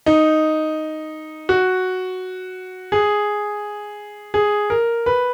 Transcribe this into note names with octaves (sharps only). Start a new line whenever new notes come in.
D#4
F#4
G#4
G#4
A#4
B4